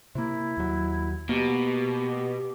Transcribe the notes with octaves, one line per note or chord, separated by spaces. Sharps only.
C3 A#3 E4
D#2 F#3
B2 A#3 G4